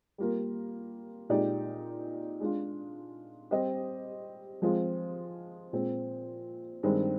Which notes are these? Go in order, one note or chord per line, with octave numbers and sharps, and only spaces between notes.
G3 A#3 F4 A#4
A#2 G#3 D#4 G4 D5
G#3 D4 F4
G3 C4 G4 C5 D#5
F3 G#3 C4 F4
A#2 G#3 C4
G2 D#3 G#3 C4